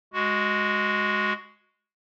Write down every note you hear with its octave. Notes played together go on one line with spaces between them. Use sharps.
G#3 F#4